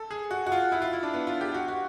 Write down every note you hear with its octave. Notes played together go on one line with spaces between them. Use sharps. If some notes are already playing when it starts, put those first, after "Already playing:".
Already playing: A4
G#4
F#4
F#4
F4
E4
F4
E4
D4
B3
F4
G4
F#4
F#4